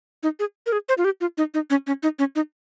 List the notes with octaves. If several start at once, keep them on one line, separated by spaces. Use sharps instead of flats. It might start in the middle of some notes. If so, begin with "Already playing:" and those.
D#4
G#4
A#4
G#4
C5
F4
G4
F4
D#4
D#4
C#4
C#4
D#4
C#4
D#4